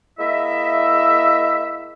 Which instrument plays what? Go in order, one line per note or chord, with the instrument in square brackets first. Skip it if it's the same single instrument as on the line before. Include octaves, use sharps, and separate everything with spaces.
[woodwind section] G#3 A#3 E4 D#5 E5